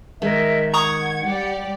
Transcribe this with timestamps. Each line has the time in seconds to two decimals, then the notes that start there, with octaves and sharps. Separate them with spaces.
0.22 D#3 G#3 A#4 D#5 E5
0.74 F#5 A#5 C#6 D#6 G#6
1.24 G3 G4 D5